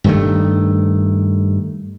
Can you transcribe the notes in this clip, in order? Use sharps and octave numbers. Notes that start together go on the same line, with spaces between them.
G2 D#3 A3